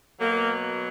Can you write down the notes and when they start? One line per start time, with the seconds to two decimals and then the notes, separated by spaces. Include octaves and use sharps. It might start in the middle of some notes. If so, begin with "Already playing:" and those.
0.20 B2 F#3 A#3